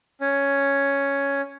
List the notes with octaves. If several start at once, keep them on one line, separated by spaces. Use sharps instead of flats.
C#4